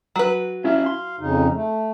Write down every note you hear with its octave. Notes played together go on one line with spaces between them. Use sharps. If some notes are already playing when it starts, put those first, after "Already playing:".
F#3 B4
C#4 E4 E5 F5
C6
F2 C#3 D#4
A3